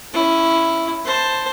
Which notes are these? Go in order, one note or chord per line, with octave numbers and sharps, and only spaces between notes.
C#4 E4
C5 A5